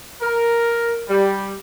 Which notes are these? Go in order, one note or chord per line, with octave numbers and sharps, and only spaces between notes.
A#4
G3